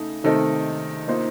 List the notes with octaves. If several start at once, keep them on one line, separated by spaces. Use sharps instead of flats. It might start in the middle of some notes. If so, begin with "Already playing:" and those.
Already playing: C#3 A3 D#4
C3 D#3 A3 C4 D#4 A4 D#5
D#3 A#3 F4 C5 D#5